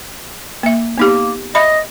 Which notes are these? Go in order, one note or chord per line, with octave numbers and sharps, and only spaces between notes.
A#3 E5
A#3 B3 D#4 G4
D#5 E5 B5